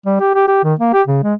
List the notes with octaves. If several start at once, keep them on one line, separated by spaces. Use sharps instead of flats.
G3
G4
G4
G4
D#3
A#3
G4
C#3
G#3